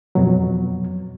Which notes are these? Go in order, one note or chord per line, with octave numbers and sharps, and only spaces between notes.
F2 B2 F#3